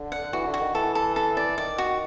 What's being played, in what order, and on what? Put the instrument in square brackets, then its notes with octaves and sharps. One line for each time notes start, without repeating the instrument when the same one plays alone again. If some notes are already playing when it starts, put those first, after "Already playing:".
Already playing: [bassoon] D3
[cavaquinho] F#5
[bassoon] E3 [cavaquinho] F#4
[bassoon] D3
[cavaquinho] F#4
[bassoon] D#3
[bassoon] E3 [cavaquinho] A4
[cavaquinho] A4
A4
D5
[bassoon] D#3 [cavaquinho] D5
[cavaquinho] F#4